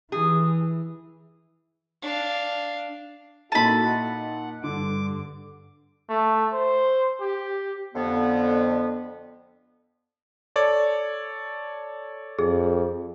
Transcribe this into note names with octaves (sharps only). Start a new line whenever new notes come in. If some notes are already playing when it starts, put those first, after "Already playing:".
E3 G#4
D4 F5
A#2 D#4 E4 F#4 A4 A5 B5 D#7
F#5
G2 D3 D6
A3
C5
G4
F2 D3 B3
A4 C#5 D5
F2 G#4